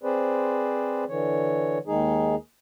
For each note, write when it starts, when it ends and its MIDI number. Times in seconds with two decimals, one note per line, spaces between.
0.03 1.04 60
0.03 1.04 68
0.03 1.04 71
0.03 1.04 72
0.03 1.04 74
1.09 1.78 50
1.09 1.78 52
1.09 1.78 73
1.87 2.35 39
1.87 2.35 51
1.87 2.35 56
1.87 2.35 63
1.87 2.35 68